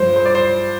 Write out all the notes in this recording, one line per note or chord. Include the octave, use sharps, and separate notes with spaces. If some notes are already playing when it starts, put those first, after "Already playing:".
Already playing: G2 F3 C5
C5
D5
C5